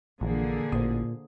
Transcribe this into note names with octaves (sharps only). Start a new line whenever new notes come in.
A#1 A#2 D3 E3 F3 A#3 G#4
A1 A#2 C5 D#6